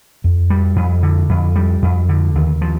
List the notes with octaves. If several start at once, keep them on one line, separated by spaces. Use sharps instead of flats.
F2
G3
F2
D3
F2
G3
F2
D3
D#2
F3